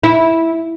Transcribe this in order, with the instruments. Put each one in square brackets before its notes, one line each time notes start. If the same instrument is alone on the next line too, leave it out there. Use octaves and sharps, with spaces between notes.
[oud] E4